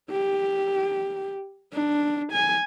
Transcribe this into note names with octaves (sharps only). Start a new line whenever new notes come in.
G4
D4
G#5